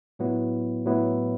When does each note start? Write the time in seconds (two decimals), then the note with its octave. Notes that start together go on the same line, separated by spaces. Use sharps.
0.19 A2 F#3 B3 E4
0.85 A2 F#3 B3 E4